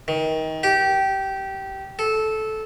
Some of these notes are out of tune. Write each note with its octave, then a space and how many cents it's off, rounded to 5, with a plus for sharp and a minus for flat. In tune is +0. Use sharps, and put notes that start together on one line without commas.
D#3 +25
G4 -15
A4 -15